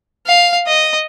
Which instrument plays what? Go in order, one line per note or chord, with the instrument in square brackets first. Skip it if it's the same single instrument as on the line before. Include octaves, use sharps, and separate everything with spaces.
[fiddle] F5
D#5